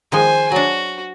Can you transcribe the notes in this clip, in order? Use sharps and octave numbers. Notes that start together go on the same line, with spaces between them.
D#3 F3 G#3 C5 G#5
F#3 D4 F#4